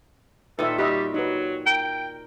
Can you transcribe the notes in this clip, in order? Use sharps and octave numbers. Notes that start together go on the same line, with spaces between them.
A#2 D#3 A4 B4 E5
G3 F#4 G4 D#5 E5
F#3 D#4 B4
A#4 G5